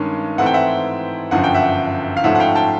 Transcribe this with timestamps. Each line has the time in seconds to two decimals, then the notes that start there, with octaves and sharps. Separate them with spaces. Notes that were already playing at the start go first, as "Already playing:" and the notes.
Already playing: G2 D#3 G#3 C#4
0.38 G#2 E3 A3 C4 E4 F#5
0.46 G5
0.54 E5 F#5
1.31 G1 F#2 D3 F3 F#5
1.44 G5
1.54 E5 F#5
2.17 F5
2.24 G#2 F3 A3 C#4 E5 F#5
2.35 F#5
2.40 F5 G5
2.55 G5 A5